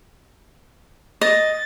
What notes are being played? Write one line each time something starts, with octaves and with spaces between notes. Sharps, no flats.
D#5 A6